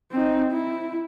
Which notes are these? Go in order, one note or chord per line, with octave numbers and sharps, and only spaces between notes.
C4 D#4
E4